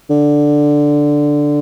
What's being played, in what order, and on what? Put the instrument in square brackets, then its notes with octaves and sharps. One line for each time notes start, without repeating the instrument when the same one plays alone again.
[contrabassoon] D3